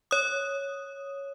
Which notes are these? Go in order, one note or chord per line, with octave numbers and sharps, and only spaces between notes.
C#5 D#6